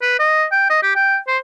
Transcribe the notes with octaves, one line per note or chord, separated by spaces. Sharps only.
B4
D#5
G5
D#5
G4
G5
C5